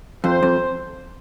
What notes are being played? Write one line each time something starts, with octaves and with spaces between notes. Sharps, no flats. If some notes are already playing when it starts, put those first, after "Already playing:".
F2 C5
F2